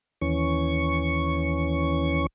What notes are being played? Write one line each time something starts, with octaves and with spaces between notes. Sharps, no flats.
D#2 E3 C#4 C#6